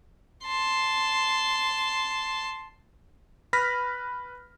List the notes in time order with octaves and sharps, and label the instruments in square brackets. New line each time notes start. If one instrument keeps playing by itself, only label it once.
[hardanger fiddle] A5 C6
[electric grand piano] B4 B5 F6 A#6 B6